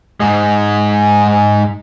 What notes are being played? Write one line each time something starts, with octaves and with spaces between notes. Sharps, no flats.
G#2 G#3